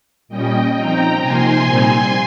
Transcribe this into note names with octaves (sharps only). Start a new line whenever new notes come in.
A#2 G3 C#4 D#5 G5
F3 C4 D#4 G5 A#5
C3 F3 A#3 D#4 G#5 C6
A#2 G3 C4 D#4